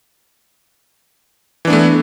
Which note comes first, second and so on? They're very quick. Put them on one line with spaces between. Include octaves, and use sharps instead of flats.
E3 D4 B3 A3